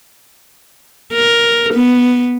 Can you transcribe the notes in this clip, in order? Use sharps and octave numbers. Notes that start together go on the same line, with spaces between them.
A#4
B3